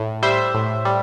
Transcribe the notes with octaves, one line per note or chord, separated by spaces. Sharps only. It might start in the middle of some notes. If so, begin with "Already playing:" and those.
Already playing: A2
G3 C5 E5
A2
G3